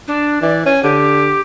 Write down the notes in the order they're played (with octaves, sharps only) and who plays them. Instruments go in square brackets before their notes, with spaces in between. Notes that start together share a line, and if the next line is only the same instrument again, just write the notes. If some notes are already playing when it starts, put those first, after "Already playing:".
[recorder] D4
[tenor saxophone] E3 [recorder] D5
[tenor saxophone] C#4 [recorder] G#5
[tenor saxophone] D3 [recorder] G4